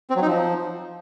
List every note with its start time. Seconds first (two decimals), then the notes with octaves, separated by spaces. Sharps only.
0.10 C4
0.16 F#3
0.22 D#4
0.28 F3